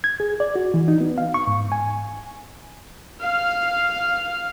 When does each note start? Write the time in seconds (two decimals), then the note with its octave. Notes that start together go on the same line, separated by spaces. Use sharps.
0.04 G#6
0.20 G#4
0.40 D5
0.56 F#4
0.74 E3
0.88 D#4
1.01 B3
1.18 F5
1.34 C#6
1.47 G#2
1.72 G#5
3.21 F5 F6